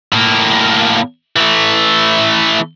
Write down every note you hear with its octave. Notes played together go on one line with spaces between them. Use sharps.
A2 A#3
E3 A3